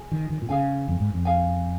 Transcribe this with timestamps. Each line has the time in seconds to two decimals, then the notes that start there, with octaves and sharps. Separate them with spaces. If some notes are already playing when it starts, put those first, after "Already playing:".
Already playing: G#4 G#5
0.12 D#3
0.30 D#3
0.42 A#2
0.49 C#3 G#4 F5 G#5
0.88 F2
1.00 G#2
1.14 F2
1.25 G#4 F5 G#5